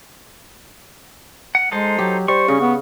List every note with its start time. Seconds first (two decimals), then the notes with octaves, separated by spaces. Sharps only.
1.55 F#5
1.72 G#3 D#4 A4 C5
1.99 F#3 G4
2.28 G3 C5 C#6
2.48 C#3 C#4
2.60 B3